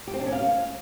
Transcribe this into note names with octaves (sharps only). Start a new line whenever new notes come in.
G4
C4
D4
C#4
F5